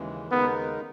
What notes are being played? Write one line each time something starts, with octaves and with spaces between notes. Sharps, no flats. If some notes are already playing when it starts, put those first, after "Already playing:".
Already playing: D#2 C#3 E3 G#3
D#2 C#3 G#3 B3 D#4 A#4